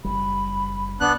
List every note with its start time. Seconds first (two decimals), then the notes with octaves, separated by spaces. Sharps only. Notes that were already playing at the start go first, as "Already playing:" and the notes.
0.04 F#1 G3 B5
1.01 C2 B3 D4 F#6